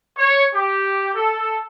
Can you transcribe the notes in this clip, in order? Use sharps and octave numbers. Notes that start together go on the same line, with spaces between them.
C#5
G4
A4